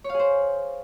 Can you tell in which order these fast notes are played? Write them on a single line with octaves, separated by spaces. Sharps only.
C#5 F5 G#4 C5